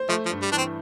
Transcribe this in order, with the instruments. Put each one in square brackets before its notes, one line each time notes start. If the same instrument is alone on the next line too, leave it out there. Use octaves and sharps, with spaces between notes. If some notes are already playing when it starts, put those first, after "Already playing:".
Already playing: [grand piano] C5
[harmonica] F3 [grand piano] A3
[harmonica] F3
[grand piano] G2
[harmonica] G3
[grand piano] E3 [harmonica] D4
[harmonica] C4